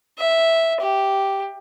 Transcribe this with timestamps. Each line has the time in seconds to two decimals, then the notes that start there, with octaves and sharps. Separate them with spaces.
0.18 E5
0.81 G4